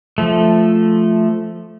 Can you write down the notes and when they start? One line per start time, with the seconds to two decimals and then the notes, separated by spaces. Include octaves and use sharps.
0.18 F3 A3